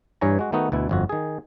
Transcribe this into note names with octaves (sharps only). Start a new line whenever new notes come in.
G2 E3 C#5 G#5 A#5
G#3 F#4
D#3 A3 B3 D#4 F#4
D2 B2 E4
G1 F2 F#4
D#3 G#4